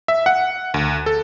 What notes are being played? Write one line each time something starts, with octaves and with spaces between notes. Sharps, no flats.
E5
F#5
D2
A4